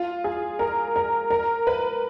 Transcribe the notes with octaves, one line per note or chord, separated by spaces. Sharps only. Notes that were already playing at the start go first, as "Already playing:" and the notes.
Already playing: F4
G#4
A#4
A#4
A#4
B4